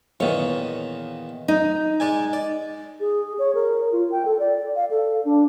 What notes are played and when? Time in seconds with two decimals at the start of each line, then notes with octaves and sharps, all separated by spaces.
0.20 E2 A#2 D#3 C#5
1.48 D#4
2.00 G#3 D5 G#5
2.33 D5
3.00 G#4
3.39 C#5
3.55 A#4
3.92 F4
4.12 G5
4.25 A4
4.39 D5
4.76 F5
4.90 A4
5.25 D4